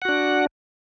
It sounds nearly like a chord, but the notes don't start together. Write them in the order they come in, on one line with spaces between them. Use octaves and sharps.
F#5 F#4 D4